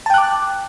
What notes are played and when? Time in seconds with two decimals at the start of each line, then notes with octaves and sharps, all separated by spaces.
0.06 A5
0.10 G5
0.14 F#6
0.18 D6